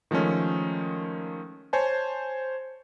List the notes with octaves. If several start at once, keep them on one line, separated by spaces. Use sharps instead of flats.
D#3 F3 G#3 A3 C#4
C5 C#5 G#5 A5